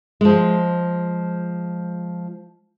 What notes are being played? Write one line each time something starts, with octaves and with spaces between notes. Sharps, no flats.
F3 G#3